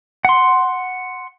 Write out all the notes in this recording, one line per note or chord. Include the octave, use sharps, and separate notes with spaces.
F#5 C6